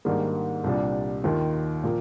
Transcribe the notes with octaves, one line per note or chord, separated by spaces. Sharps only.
G#2 D#3 G3 A#3 D4
C2 A#2 G3 D4
D#2 D#3 A#3 F4
A#2 F3 A#3